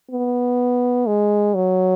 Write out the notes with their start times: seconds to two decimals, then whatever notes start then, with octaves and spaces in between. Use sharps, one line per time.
0.11 B3
1.07 G#3
1.55 F#3